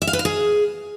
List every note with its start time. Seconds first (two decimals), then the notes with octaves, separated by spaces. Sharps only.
0.02 E5
0.07 F5
0.13 B4
0.19 F5
0.25 G#4